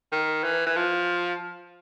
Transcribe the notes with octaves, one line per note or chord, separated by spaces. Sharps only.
D#3
E3
E3
F3